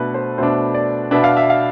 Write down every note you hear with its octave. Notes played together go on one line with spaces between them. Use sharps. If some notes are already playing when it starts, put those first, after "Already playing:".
Already playing: B2 A3 D4 A4 B4
C5
B2 A3 D4 C5
D5
B2 B3 D4 E5
F5
E5
F5